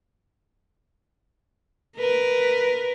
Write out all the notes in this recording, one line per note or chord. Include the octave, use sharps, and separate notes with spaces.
A#4 B4